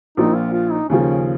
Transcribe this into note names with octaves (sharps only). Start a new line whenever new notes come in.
A#1 A#2 F3 D#4
F4
F4
D#4
D#2 C#3 F3 C#4